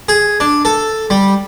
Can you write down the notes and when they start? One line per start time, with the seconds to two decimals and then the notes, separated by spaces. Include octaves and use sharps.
0.09 G#4
0.40 D4
0.65 A4
1.10 G3